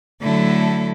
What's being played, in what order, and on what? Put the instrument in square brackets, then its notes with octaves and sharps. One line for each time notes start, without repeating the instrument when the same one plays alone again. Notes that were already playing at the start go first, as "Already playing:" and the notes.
[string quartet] D3 F#3 A3 E4 A4